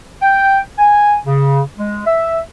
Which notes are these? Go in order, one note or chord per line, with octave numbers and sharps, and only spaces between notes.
G5
G#5
C#3
G#3
E5